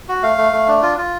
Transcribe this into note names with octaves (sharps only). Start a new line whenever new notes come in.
F#4
A3 F5
A3
A3
D4
F4
F4